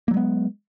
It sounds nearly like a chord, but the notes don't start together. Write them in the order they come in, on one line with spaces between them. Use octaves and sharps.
A#3 F#3 G#3 B3